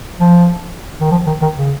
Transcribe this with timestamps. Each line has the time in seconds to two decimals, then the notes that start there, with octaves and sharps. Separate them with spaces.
0.20 F3
1.00 D#3
1.11 F3
1.27 D#3
1.42 D#3
1.57 C#3